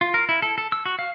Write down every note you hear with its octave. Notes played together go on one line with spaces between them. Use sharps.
F4
A#4
E4
A4
A4
E6
F#4
F5